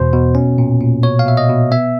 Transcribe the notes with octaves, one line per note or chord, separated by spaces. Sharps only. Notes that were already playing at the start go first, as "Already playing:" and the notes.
Already playing: E2 B2 C5
B2
C#4
A#2
A#2
B2 C#5
F5
B2 E5
D#5
B2
B3 E5